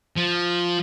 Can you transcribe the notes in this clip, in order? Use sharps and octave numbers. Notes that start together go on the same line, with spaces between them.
F3